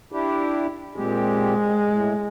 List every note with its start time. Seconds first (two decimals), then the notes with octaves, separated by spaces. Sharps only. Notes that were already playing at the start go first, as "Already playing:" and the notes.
0.12 D4 E4 G4
0.96 A#2 G#3 C4 G4
1.91 A2